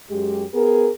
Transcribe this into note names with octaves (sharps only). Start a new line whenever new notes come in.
F#2 G#3 G4
B3 G#4 A#4